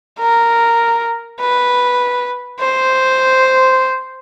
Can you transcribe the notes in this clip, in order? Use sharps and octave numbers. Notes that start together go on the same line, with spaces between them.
A#4
B4
C5